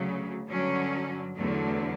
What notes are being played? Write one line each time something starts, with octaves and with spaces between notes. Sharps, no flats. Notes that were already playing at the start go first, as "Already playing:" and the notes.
Already playing: D2 C#3 F#3
G2 D3 F#3 C#4
E2 D3 F#3 A3